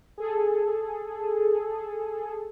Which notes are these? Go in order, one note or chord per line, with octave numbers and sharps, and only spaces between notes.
G#4 A4